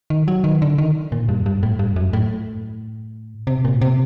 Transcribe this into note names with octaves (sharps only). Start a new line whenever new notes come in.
D#3
F#3
D#3
D3
D#3
A#2
G2
G2
A2
G2
F#2
A2
C3
A#2
C3